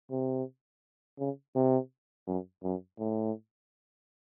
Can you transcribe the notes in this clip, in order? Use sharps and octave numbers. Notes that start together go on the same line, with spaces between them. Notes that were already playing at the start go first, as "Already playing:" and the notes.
C3
C#3
C3
F#2
F#2
A2